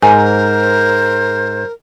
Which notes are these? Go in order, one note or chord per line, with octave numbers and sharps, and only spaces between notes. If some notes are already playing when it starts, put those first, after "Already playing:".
G#2 A#4 C5 G#5